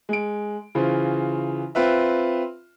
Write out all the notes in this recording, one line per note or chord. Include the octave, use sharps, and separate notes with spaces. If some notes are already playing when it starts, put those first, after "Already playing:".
G#3 D7
C#3 E3 F4 C5
C4 F4 B4 E5